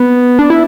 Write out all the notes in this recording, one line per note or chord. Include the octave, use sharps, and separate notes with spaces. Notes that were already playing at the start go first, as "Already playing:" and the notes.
Already playing: B3
D4
E4